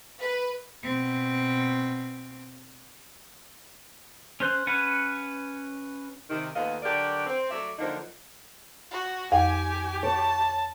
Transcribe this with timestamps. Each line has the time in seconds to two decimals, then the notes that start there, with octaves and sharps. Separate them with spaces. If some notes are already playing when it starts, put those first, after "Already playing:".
0.21 B4
0.83 B2 C4
4.40 C#4 C5 F#6
4.67 C#4 B4 F#5
6.30 C3 D#3
6.55 D#2 A3 B3 F4 D#5 F5
6.83 D3 F#3 F#4 G4 A#4 D5
7.26 C4
7.50 F#3 A3 D5 E5
7.79 D3 F3 F#3 A#3 D4 D#4
8.91 F#4
9.32 F2 G4 G5 G#5
10.03 C#5 A5